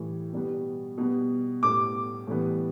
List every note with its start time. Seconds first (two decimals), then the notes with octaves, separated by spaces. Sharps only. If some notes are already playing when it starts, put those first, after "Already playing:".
Already playing: A2 E3 G3
0.33 B2 G3 B3
0.98 B2 G3 B3
1.63 A2 G3 B3 D6
2.27 A2 E3 G3 B3